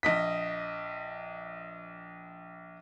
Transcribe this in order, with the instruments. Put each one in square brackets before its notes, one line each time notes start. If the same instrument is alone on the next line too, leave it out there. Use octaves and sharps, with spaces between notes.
[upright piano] A#1 D#5 B6